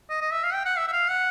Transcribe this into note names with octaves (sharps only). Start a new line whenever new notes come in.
D#5
D#5
E5
F5
G5
F#5
E5
E5
F5
F#5